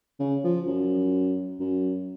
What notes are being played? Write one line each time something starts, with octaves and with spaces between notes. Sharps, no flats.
C#3
F3
F#2
F#2